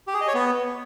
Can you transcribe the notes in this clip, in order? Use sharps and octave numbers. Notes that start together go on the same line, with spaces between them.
G4
G#4
D#5
C#5
B3